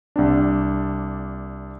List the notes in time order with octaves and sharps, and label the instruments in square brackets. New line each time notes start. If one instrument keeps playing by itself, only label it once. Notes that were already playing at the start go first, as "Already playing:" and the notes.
[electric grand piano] C2 C4 D4